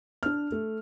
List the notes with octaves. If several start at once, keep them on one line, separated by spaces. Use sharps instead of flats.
D4 F6
A3